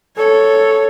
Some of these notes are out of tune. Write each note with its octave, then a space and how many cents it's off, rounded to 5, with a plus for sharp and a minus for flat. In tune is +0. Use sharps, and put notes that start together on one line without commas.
A4 +0 C#5 +0